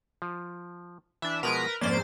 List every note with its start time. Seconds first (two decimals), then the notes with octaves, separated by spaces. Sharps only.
0.22 F3
1.22 E3 D4 E5
1.43 B2 F3 G#3 A#4 B4 A#5
1.81 F2 G#2 A#3 C#4 B4 C5 D5 A6